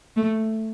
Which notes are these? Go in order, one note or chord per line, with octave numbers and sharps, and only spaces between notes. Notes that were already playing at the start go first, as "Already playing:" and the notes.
A3